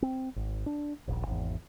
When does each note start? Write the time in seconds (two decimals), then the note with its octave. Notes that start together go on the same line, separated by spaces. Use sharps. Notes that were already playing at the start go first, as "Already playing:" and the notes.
0.02 C4
0.36 G#1
0.66 D4
1.07 D#1 A#1
1.27 G#1 E2